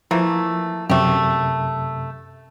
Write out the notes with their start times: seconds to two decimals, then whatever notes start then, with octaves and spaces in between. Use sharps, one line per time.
0.11 E3 F3 A3 A#3
0.90 F#2 C3 A3 G4